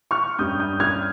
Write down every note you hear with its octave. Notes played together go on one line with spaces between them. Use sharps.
C#6 F6
G2 G3 C#4 D#6 G6
D#6 G6
F6 G#6